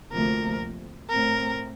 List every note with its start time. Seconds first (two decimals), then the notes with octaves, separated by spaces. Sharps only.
0.12 D2 C3 F3 A#3 A#4
1.09 A2 A3 C4 A#4